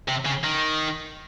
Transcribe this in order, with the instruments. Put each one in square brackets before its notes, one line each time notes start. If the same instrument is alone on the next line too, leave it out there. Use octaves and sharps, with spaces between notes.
[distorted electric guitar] C3
C#3
D#3